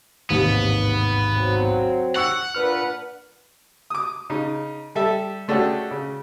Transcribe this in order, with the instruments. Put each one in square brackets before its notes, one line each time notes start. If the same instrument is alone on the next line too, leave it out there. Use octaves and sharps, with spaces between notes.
[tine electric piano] A1 G#2 [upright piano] D#2 C3 [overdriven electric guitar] B3
[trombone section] F#3 C4
[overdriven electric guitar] F#5 [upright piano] C#6 E6 C#7
[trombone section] A#2 D4 B4 [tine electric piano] F6
[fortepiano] D6 D#6
C#3 D#4
G3 A4 E5
G#3 A3 C#4 D4 F#4 G4
C#3